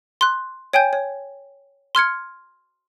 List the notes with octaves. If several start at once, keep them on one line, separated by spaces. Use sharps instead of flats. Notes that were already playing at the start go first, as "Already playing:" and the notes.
C6 F#6
C#5 G5 G#5 G6
C#5
C6 F6 G#6 C#7